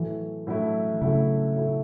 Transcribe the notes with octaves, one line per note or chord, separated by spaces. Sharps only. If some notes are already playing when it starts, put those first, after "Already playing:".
Already playing: A2 E3 F#3 A3 E4
A2 F#3 A3 E4
A2 C#3 F#3 A3 E4
A2 F#3 A3 E4